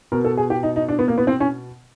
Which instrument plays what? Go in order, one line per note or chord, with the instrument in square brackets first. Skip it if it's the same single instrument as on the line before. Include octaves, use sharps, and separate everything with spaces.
[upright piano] B2 A#4
A4
G#4
G4
D#4
D#4
D4
B3
A#3
B3
C4
C#4